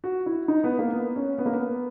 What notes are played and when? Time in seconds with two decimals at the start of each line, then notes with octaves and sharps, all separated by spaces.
0.04 F#4
0.26 E4
0.48 D#4
0.64 B3
0.79 A#3
0.93 B3
1.16 C#4
1.38 B3
1.46 A#3
1.53 B3